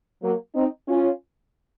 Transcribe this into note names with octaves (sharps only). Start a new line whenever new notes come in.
F#3 A#3
C4 D#4
C#4 F4